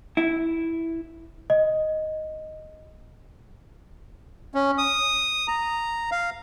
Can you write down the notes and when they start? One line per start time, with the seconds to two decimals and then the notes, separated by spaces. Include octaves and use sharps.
0.17 E4
1.50 D#5
4.54 C#4
4.78 D#6
5.48 A#5
6.11 F5